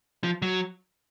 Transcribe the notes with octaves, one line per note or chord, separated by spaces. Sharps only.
F3
F#3